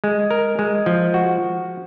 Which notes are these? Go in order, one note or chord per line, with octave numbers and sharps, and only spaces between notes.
G#3
A#4
G#3
F3
F#4